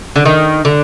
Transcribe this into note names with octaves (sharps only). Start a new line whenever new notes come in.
D3
D#3
D3